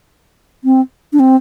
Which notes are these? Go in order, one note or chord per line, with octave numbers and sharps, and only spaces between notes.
C4
D4
C4